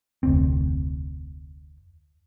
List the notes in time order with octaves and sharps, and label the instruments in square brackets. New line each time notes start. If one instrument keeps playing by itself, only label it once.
[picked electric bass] F1 D2 C4